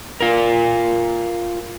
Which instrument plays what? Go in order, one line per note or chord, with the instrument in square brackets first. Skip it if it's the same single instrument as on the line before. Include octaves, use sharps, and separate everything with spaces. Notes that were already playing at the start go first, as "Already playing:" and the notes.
[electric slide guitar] F4 A#4